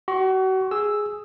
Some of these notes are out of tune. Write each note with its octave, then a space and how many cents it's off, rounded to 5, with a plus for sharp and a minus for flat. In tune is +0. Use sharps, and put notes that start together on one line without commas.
F#4 +35 C#6 -35
G#4 +0 E6 +0